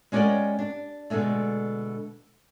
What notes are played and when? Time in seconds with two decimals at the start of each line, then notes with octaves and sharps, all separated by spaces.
0.12 G#3 C#4 G4 A#4 D5 F#5
0.59 D4
1.10 B2 D3 G#3 A3